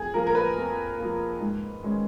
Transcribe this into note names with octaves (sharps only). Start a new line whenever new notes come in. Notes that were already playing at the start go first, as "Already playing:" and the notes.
Already playing: F2 G#4
F3 A#3 A#4
A#4
B4
F2
F3 A#3
G#2
D#3 G#3 C#4